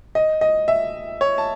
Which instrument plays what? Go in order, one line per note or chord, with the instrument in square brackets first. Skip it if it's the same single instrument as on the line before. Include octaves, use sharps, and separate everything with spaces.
[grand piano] D#5
D#5
E5
C#5
A5